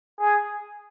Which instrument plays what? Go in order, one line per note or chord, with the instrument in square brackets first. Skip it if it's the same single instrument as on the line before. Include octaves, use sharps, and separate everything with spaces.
[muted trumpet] G#4